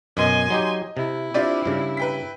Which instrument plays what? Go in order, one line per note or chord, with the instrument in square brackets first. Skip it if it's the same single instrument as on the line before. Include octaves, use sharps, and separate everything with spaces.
[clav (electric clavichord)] F#2 B2 [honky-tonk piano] D#5 [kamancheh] G#5 C6
[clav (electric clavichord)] F#3 D#4 G4
[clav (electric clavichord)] C3 [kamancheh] E4
[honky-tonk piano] C4 D4 F4 [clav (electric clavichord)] G4 D5 E5
[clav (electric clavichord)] G2 C#3
[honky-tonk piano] B4 G5 B6